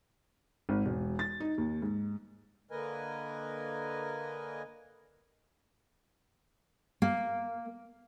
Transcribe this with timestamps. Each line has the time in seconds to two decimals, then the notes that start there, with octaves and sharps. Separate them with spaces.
0.69 G#1
0.85 E1
1.19 A6
1.40 D#4
1.58 D#2
1.82 G#2
2.71 D3 A#3 A#4 B4 D#5 G#5
7.02 A#3